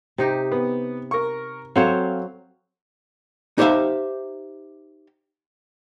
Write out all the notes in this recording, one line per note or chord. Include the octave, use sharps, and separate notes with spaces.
C3 D#4 G4
B3
A#4 C#6
F#3 C4 A4 C5 C#5 F5
D#4 G4 C5 C#5 E5 F5